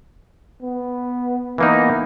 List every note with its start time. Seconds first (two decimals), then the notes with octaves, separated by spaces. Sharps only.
0.62 B3
1.58 E3 A#3 B3 D#4